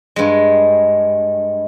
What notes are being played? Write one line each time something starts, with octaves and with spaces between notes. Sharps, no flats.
G2 G#3